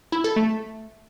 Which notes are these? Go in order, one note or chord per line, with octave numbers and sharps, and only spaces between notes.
E4
A4
A3